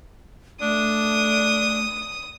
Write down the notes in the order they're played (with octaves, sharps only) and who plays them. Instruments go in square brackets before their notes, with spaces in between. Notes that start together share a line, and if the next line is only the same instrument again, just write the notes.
[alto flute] A3 [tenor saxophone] D4 [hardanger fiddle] D#6